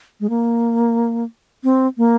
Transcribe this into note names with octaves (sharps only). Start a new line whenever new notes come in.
G#3
A#3
C4
A#3